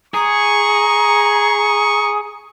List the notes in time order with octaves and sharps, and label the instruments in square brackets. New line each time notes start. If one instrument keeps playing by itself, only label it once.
[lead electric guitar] G#4 [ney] A#5 [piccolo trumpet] C#6